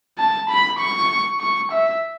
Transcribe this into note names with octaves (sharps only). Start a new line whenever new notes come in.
A5
B5
C#6
C#6
E5